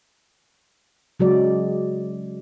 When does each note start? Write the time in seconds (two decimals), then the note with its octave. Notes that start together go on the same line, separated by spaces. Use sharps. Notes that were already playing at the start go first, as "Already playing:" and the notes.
1.20 C#3 F#3 G#3 D5